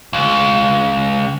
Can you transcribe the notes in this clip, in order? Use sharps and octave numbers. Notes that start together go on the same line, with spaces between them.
C#2